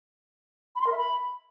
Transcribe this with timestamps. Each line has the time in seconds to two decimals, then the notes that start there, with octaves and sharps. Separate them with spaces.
0.75 B5
0.81 C6
0.86 A#4
0.92 E5
0.97 B5